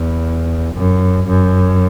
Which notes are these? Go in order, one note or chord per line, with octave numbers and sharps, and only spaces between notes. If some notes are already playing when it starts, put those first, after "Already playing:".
Already playing: E2
F#2
F#2